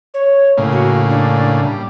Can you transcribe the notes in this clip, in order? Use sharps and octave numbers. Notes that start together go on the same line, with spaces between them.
C#5
A2 C#3 A#3
F#4
D4
G3